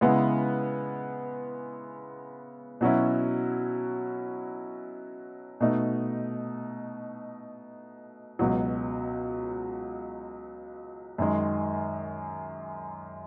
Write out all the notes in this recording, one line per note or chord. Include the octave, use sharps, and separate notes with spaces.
C#3 G#3 B3 E4
B2 F#3 C#4 E4
B2 A3 D#4
C#2 B2 F#3
F#2 D#3 G#3